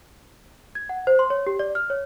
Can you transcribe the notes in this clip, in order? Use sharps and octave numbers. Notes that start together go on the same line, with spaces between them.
G#6
F#5
C5
C6
C#5
G4
D5
F6
C#5